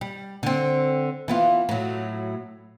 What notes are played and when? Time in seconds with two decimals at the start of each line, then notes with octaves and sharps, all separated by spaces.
0.01 G3
0.43 D3 C4
1.28 E3 B3 F4
1.69 A2 F#3